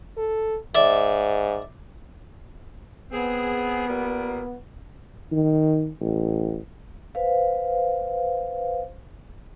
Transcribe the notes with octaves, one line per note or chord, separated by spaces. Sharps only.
A4
G#2 D5 E5
B3 C4 G#4
A#2 G3 A#3
D#3
A1
B4 C5 F5